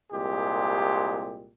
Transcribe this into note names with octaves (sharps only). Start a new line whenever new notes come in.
C2 A#2 G#3 G4